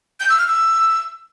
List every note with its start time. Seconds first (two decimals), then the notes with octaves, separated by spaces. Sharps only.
0.20 G6
0.29 E6
0.39 F6
0.48 E6